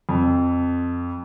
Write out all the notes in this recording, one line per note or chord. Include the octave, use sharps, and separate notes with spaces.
F2